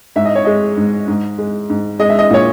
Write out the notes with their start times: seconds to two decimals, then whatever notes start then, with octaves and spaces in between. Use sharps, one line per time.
0.16 G#2 E5
0.25 D#5
0.35 C#5
0.45 G#3 D#5
0.77 G#2
1.08 G#2
1.38 G#3
1.70 G#2
1.99 G#3 D#5
2.09 E5
2.19 D#5
2.31 A#2 C#5